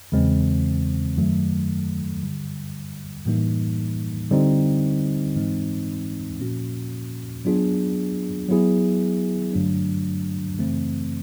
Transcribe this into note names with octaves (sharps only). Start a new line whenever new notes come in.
E2 C#3 E3 G#3 C4
F#2 D#3 F#3 A3
G2 D3 G3
A2 E3 G3 A#3 D#4
D3 G3 C4 D#4
G#2 E3 G#3 C4 D#4
A#2 F3 A#3 C#4 F#4
F#3 B3 D4 F4 G#4
F#3 B3 E4 G#4
G2 D3 F#3 A3 D4
F#2 C#3 E3 A3 C4